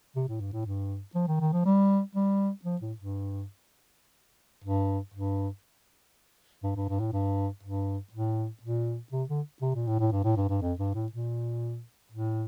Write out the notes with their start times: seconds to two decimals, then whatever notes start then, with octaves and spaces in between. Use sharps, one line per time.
0.16 C3
0.28 A2
0.40 G2
0.53 A2
0.65 G2
1.15 F3
1.27 D#3
1.40 D#3
1.53 F3
1.65 G3
2.15 G3
2.64 F3
2.81 A2
2.98 G2
4.64 G2
5.14 G2
6.63 G2
6.76 G2
6.89 G2
7.00 A2
7.13 G2
7.63 G2
8.12 A2
8.62 A#2
9.12 C3
9.29 D3
9.61 C3
9.75 A#2
9.87 A2
9.99 A2
10.12 G2
10.24 A2
10.36 G2
10.49 G2
10.61 F2
10.79 G2
10.95 A2
11.12 A#2
12.11 A2